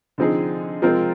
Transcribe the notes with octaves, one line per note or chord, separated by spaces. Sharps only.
D3 F3 C4 D#4 G#4
F3 G#3 C4 F4 A#4